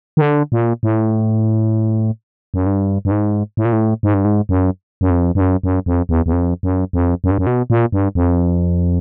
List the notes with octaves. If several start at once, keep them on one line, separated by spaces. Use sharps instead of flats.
D#3
D3
A#2
A2
F#2
G2
G2
G#2
A2
A#2
A2
G#2
G2
G#2
F#2
F#2
F2
G2
F#2
F#2
F2
E2
E2
F2
F#2
F2
F#2
G2
F#2
B2
A#2
G2
F2